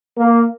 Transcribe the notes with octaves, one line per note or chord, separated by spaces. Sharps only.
A#3